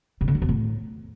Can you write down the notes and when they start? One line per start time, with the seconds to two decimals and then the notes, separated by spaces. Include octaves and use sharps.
0.21 C#3
0.28 D3
0.35 F#3
0.42 E2
0.49 A2